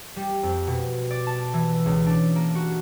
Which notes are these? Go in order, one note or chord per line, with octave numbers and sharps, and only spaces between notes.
G3
F2
B2
D5
A5
E3
C#2
D4
A#3
F#4